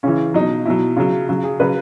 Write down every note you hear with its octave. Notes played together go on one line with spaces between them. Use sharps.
C#3 E3 C#4
B2 F#3 D#4
B2 F#3 E4
C#3 F#3
C#3 F#3
G#4
C#3 F#3 B4